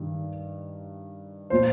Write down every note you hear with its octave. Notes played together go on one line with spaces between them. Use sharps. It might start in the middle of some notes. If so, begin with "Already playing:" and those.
Already playing: G2 D#3
A#2 F3 C5